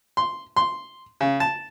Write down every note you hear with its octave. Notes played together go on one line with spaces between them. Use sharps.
C6
C6
C#3
A5